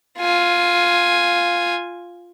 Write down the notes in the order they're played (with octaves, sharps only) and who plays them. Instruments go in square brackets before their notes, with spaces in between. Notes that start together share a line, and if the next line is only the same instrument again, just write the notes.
[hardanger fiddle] F4 G#5